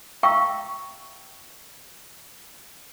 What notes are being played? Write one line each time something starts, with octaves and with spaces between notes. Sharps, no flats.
E5 F5 G5 A#5 C#6 E6